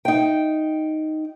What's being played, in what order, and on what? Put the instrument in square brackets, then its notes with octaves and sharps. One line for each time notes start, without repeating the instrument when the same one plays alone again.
[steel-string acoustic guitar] D#4 G5